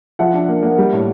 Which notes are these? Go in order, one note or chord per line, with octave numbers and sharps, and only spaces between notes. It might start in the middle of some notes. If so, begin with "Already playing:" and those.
F3 E5 F#5
D4
A#3
A#3
G3
A2